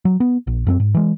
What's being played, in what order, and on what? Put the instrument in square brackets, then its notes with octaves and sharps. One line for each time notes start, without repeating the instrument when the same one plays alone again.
[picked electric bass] F#3
B3
A#1
F#2 A#3 C4
G#2
E3 G#3